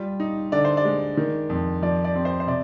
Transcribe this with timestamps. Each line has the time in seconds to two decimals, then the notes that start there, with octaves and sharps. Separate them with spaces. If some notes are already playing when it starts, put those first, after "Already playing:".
Already playing: G3 F4
0.20 D#4
0.52 D3 D5
0.65 C5
0.77 D5
0.85 G#3
1.17 D#3
1.49 F2
1.82 F3 D5
2.04 D5
2.15 C4
2.25 C5
2.40 C5
2.47 C3 D5